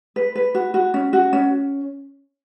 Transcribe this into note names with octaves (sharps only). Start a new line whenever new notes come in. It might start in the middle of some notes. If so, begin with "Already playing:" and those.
B4
B4
F#4
F#4
C#4
F#4
C#4